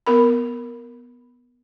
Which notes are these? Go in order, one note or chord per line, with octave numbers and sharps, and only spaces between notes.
B3 A#4 B5